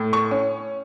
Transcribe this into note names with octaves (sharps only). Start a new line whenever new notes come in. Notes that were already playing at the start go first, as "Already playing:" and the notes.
Already playing: A2
C#6
C#4